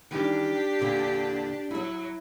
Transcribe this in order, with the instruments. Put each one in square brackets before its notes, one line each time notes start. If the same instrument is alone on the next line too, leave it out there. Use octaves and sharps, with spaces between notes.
[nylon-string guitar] D#3 E3 G3 [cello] D4 G4
[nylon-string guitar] E2 A#2 D3
[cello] F#3 [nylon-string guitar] E4 E5